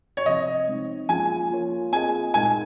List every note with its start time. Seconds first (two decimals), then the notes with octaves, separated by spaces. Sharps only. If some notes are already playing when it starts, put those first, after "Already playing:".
0.17 C#5
0.26 C3 F3 C4 D#5
0.68 G#3 C4 D#4
1.08 F3 A#3 C#4 F4 G#4 G#5
1.50 A#3 F4 A#4 C#5
1.93 C4 F4 G#4 D#5 G#5
2.34 A#2 G#3 D#4 A#4 G#5